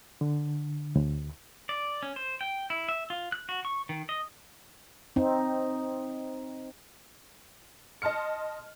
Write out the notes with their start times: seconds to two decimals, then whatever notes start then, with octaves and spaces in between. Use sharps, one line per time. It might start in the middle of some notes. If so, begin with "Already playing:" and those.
0.21 D3
0.95 D2
1.69 D5
2.03 C#4
2.16 C5
2.41 G5
2.70 E4
2.89 E5
3.10 F4
3.32 F#6
3.49 F#4
3.65 C#6
3.89 D#3
4.09 D#5
5.16 C4 D#4
8.02 D#5 A5 C6 F6 C#7